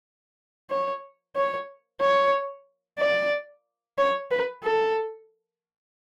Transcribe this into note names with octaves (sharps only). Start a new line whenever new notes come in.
C#5
C#5
C#5
D5
C#5
B4
A4